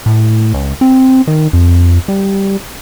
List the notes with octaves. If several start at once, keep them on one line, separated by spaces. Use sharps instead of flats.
A2
C#2
C4
D#3
F2
G3